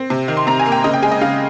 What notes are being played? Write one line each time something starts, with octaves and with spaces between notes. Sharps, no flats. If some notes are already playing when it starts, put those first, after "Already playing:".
Already playing: C4
C3
D#3
C6
C3 A#5
G#5
A#3
G5
C#3 D#5
G5
G#3 G#5
D#5
C#3 F5